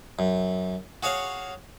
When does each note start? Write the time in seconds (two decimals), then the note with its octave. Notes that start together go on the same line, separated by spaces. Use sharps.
0.19 F#2
1.03 F#4 G#4 C#5 F5